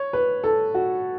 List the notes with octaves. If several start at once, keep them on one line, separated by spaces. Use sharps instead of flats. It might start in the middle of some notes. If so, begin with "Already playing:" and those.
Already playing: C#5
B4
A4
F#4